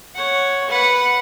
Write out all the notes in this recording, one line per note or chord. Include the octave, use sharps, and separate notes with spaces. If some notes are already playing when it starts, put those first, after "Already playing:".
C#5 F#5
B4 F#5